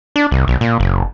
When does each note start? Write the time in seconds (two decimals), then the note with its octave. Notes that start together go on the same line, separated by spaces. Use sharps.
0.16 D4
0.31 C2
0.48 B1
0.61 A#2
0.80 F#1